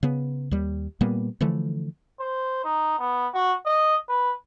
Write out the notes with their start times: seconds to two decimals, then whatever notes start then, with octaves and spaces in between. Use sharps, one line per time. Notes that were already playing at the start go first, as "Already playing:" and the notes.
0.03 C#3 B3
0.51 D#2 G3
1.01 A#2 G3 A#3 B3
1.41 D3 E3 F3 A3
2.20 C5
2.65 D#4
2.99 B3
3.34 F#4
3.66 D#5
4.08 B4